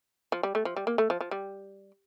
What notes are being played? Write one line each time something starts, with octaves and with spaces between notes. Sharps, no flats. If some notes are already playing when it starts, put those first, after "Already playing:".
F3
G3
A3
F3
G3
A#3
A3
F3
F3
G3